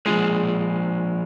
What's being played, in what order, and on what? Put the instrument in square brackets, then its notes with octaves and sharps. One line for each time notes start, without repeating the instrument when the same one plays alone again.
[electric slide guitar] F3 A#3 F4 G#4 [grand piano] G#3